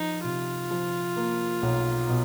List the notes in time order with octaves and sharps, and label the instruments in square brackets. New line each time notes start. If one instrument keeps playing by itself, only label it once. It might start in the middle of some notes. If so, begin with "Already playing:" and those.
Already playing: [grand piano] F3 [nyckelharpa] D#4
[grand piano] C3 [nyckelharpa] F4
[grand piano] F3
A#3
B1
B2